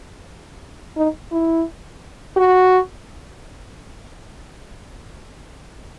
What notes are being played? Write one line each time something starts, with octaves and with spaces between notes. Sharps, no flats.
D#4
E4
F#4